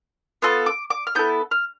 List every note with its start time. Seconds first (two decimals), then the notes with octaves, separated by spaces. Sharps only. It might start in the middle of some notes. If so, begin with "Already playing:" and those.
0.42 B3 F4 A4
0.66 D6
0.90 D6
1.07 F6
1.15 B3 E4 A4 G6
1.51 F6